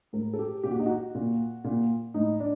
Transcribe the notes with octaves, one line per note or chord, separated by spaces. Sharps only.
A2 A#4
A4
G4
A#2 G4
F#4
D#4
F#4
A#2
A#2
A2 D#4
D4